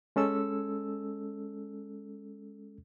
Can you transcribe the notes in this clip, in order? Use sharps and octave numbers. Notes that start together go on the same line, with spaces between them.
G#3 C#4 A4 E6